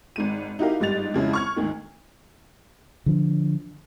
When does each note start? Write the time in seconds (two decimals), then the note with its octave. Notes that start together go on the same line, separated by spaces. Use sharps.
0.16 G#1 G#2 D#7
0.59 D#4 E4 F#4 G4 A#4 F5
0.80 G1 G#2 G3 D#5 A6 F7
1.14 F2 C#3 G#3 E4
1.33 C#6 F6 G#6
1.56 D2 G#2 D#3
3.06 D3 F3 D4